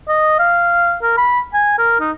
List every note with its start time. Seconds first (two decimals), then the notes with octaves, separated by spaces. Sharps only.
0.08 D#5
0.39 F5
1.03 A#4
1.18 B5
1.54 G#5
1.78 A#4
2.00 D#4